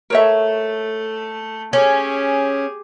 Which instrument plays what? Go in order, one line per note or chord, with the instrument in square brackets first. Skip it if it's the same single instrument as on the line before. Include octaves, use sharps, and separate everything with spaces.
[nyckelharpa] A3 A4 [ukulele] A#4 C#5 E5
[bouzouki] C#4 [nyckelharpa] G4 G#4